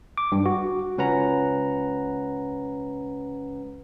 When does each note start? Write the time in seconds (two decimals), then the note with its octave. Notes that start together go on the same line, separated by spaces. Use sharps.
0.18 D6
0.32 G2
0.46 F#4
0.98 C#2 C#4 B4 F#5 A#5